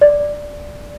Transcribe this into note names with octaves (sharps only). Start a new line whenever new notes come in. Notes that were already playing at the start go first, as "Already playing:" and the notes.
D5